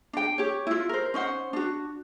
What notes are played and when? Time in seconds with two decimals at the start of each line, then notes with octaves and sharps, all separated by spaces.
0.13 D4 G5
0.38 G4 C#5
0.67 E4 F4
0.89 A#4 C5
1.14 C#4 D#4 C5 F#5
1.53 D4 F#4